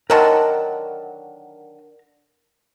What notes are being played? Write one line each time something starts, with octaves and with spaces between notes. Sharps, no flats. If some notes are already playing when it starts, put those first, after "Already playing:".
D3 D#3 F#3 A#4 A5